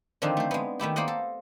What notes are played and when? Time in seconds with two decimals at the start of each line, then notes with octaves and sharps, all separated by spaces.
0.22 D3 D#3 F3 C4 D4 D#4
0.37 A3 C5
0.51 G#3 B3
0.79 D#3 A3 E4 G4
0.96 A#3 C5 D5 D#5 F#5
1.08 A4